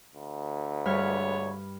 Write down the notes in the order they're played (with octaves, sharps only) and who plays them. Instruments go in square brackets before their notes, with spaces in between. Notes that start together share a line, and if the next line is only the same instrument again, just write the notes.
[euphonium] D2
[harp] G2 B5 F6 [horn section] G#3 B3 C#5